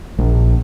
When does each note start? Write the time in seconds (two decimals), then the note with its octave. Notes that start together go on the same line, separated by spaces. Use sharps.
0.19 A#1